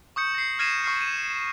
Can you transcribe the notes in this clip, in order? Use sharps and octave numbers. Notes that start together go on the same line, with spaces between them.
C#6 D#6 G6 C#7
A#6 C7
F6 G#6 A#6 C7 D#7 E7
C#6 F6 C7
D#7